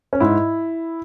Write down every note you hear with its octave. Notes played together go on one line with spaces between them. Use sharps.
C#4
G#2 E4